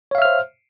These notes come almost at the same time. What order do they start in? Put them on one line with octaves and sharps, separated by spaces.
C#5 F5 E5 F6 C5